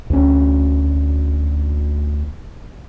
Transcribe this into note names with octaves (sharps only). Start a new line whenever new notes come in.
D2 C#4